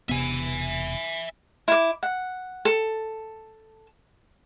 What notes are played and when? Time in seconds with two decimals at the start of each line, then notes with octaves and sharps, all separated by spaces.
0.09 E1 C3 B3 E5 G#5
1.68 E4 D6
2.03 F#5
2.65 A4